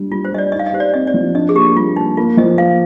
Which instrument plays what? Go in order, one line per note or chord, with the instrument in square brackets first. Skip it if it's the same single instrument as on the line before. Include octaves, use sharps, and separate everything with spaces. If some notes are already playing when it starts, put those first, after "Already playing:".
Already playing: [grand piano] G3 D4
[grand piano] G3 [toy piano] F4
[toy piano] C5
[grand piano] G3 [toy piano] D#5
[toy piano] D5
[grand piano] D#4 [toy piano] D#5
[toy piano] F5
D#5
[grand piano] G4 [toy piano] C5
[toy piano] D5
[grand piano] C4 [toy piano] D#5
[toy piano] D5
[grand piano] F3
[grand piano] D4 [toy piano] D#5
[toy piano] G#4
[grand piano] A#3 [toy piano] G4
[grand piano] G3 [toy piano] F4
[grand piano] A#3 [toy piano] D#4
[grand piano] A#3 [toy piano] F4
[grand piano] F3 [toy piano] D#5
[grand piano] A#3 [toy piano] F5